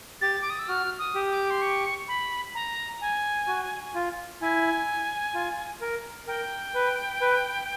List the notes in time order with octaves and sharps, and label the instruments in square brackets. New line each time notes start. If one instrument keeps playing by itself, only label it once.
[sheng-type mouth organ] G4 [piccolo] A6
[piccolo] D6
D#6
E6
[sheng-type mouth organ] F#4 [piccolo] F6
[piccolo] D#6
[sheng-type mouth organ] G4
[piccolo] D6
C6
C#6
B5
A#5
G#5
[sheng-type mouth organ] F#4
F4
[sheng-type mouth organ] E4 [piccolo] G#5
[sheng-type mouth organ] F4
A#4
[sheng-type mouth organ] A#4 [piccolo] G5
[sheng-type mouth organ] B4
B4